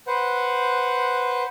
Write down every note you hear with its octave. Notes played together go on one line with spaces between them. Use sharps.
B4 C5 F#5